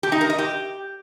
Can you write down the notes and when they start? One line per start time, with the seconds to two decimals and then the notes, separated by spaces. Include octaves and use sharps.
0.03 G4
0.12 D#4
0.21 A#4
0.30 D#5
0.38 G4